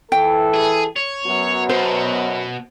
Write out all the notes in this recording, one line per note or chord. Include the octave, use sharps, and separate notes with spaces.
E3 A4 G5
G#4
C#5
F#2 F#3 B3
B2 C5